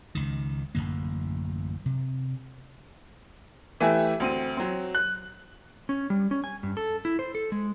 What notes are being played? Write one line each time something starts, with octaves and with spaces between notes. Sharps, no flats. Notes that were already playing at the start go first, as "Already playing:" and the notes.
C#2 D#3
A1 F#2 D3 A#3
C3
E3 A3 G4 E5 G#5
D2 C4 D#7
F#3 C4
F#6
C#4
G3
C#4
G#5
G2
A4
E4
C5
A4
G#3